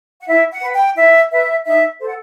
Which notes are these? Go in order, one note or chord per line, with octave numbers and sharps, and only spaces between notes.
F#5
E4 E5
F#5
B4
G5
E4 E5
B4 E5
D#4 E5
A4 C5
F#5